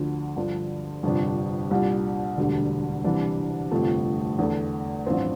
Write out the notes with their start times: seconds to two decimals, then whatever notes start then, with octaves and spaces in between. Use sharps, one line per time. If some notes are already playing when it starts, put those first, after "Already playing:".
Already playing: D2 D3 F3
0.36 G2 D3 F3
1.03 G1 F2 C3 G3 D4
1.71 C2 A#2 G3 D4
2.37 E1 D2 D3 G3
3.04 C2 C3 E3 G3 D4
3.71 G1 F2 C3 F3 A3
4.38 E2 D3 A3
5.06 A1 G2 F3 C4 F4